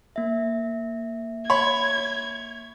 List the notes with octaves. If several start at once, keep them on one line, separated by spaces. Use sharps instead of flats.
A#3 E5
C#5 B5 G#6